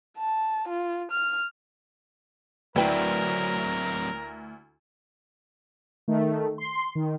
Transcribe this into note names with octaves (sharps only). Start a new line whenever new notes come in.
A5
F4
F6
D2 F#3 C4 E4 A#4 B4 D5 G5
D#3 A3
C6
D#3